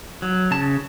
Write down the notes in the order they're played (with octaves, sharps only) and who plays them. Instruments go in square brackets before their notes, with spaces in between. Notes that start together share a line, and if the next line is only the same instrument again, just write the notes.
[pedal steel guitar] F#3
C#3 A5